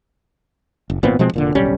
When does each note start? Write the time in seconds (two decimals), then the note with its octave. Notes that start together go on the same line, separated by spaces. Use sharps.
0.90 F#1
1.03 G#1 A#2 B3 C4
1.19 B2 F3 G#3 C4
1.33 F1 A#2 D3
1.55 D1 B1 G3 C#4